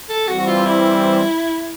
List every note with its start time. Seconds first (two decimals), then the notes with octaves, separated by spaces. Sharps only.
0.09 A4
0.27 E3 G3 C4 F#4
0.39 F#4
0.47 F4
0.66 E4